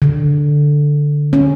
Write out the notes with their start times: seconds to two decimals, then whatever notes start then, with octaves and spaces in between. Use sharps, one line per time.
0.02 D3
1.33 C#4